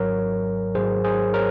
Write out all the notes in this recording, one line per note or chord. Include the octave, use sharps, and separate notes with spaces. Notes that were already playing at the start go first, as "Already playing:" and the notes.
Already playing: G#1 G#2 F#3 A#4 C#5
G#1 G#2 F#3 G#4 C5
G#4 C5
A#4 C#5